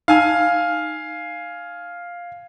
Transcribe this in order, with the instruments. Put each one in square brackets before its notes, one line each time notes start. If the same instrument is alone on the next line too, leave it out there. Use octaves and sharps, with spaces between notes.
[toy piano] D#4 B5 E6 [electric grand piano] F5 G#5 F6